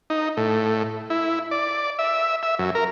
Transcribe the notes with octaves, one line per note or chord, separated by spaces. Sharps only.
D#4
A2
E4
D5
E5
E5
F#2
A#4